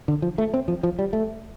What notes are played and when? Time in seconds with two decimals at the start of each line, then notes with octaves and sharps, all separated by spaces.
0.08 D3
0.22 F3
0.38 A3
0.54 C4
0.68 F3
0.83 F3
0.99 G3
1.13 A3